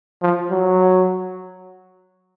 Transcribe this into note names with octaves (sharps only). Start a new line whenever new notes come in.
F3
F#3